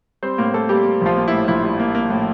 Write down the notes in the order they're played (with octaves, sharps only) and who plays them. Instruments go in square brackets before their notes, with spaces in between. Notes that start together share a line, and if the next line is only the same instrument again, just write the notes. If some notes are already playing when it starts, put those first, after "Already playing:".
[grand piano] G3 C4 C5
A2 A#3 A#4
A3 A#3 A4
G3 A#3 G4
A#3
A#1 F3 F4
A#3
A2 E4
A#1 E4
G3
A#3
A#3
A2